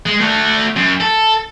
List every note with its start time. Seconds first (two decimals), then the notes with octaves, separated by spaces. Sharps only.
0.06 G#3
0.20 A3 F#4
0.76 F#2
1.01 A4